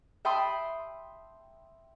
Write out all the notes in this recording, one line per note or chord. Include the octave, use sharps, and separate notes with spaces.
E5 G5 A5 B5 C6 D#6